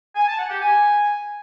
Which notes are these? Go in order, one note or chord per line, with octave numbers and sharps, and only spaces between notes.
G#5
A5
F#5
G4
G#5